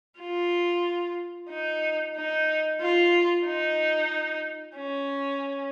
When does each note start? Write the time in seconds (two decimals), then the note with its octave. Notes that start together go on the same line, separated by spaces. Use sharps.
0.20 F4
1.50 D#4
2.16 D#4
2.82 F4
3.46 D#4
4.77 C#4